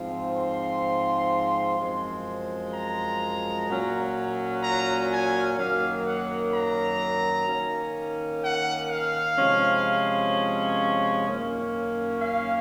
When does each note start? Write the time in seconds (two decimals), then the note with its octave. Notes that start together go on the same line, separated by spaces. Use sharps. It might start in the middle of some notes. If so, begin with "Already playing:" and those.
Already playing: G#2 F3 C4
0.36 C6
1.79 F#2 F3 G#3 C4
2.73 A#5
3.69 A#2 F#3 C#4
4.63 A#5
5.11 G#5
5.58 F#2 D#3 F#3 A#3 F5
6.06 F#5
6.53 A#5
7.47 D#3 A#3 C#4
8.43 F#5
8.89 F5
9.37 C3 F3 G#3 C#4
11.27 F#2 D#3 A#3 C#4
12.21 F5